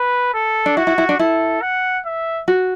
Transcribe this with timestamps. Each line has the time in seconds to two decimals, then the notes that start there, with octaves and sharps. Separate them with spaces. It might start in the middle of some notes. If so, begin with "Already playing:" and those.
Already playing: B4
0.34 A4
0.66 D4
0.77 E4 F#4
0.87 E4
0.98 E4
1.09 D4
1.19 E4 A4
1.62 F#5
2.05 E5
2.48 F#4